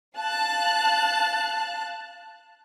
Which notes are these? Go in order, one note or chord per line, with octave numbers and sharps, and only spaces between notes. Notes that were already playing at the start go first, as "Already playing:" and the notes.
F5 A5 F#6